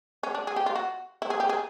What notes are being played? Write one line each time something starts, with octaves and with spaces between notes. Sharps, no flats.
C#4
D4
G#4
G4
F4
F#4
E4
G#4
G4
G#4